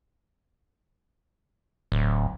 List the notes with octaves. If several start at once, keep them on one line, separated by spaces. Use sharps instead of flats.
D1